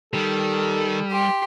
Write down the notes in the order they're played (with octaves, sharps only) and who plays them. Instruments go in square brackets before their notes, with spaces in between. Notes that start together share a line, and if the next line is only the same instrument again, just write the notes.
[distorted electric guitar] D#3 [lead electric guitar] G3 [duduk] A4
[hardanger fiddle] G4 C6